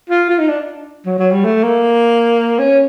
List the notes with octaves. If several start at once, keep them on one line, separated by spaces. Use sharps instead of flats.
F4
F4
D#4
D4
F#3
F#3
G3
A3
A#3
C#4